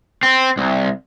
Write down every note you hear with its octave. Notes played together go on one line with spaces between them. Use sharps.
C4
C2